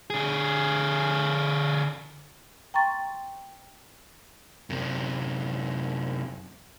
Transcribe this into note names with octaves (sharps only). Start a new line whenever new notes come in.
D3 G#4
G5 A#5 C6 C#6 A6
F#2 C3